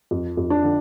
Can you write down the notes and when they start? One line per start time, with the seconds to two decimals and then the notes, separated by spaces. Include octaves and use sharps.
0.11 F2
0.37 F2
0.50 D4
0.63 D3